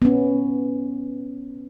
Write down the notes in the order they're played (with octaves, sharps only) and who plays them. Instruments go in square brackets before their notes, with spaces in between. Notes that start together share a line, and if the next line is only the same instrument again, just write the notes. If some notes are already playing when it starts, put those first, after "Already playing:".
[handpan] B3 C#4